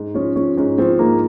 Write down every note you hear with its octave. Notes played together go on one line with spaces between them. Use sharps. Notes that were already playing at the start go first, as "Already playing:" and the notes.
Already playing: G#2
F3 C#4
F3 C#4
G#2 C#4
F3 C4
G#2 A#3